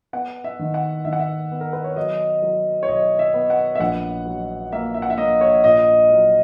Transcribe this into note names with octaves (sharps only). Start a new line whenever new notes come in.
B3 F#5
E5
D#3
F#5
D#3 E5
F#5
E5
B3
A#4
B4
C#5
F#3 D#5
F#3
C#5
B1 D#5
E5
B3
F#5
E5
A#1 F#5
F#3
A#3 E5
E5
F#5
E5
A#3 D#5
C#5
A#2 D#5
F#3